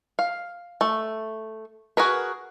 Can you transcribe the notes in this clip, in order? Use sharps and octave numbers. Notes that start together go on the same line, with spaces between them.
F5
A3
F#4 G#4 A#4 B4